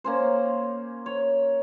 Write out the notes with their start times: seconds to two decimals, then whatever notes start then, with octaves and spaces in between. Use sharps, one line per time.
0.04 A#3 C#4 C5
1.06 C#5